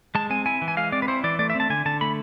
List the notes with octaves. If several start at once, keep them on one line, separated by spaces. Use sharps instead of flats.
G#3 A5
C4 G#5
E4 G#5
E3
G#5
G#3 F5
C4 D5
B4
E4 C5
E3 D5
A3 D5
E5
C4 A5
D3 G#5
D3 A5
A3 B5